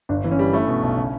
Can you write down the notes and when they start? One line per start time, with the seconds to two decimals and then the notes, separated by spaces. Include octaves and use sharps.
0.09 G1 D4
0.24 E3
0.31 C#4
0.39 G3
0.53 A3 E4
0.67 B2
0.83 B1
0.97 C#3